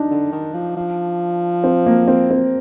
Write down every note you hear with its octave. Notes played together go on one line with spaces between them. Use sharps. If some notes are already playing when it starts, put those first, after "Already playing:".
Already playing: D4 D#4
D3
D#3
F3
F3
C4
A#3
C4
C4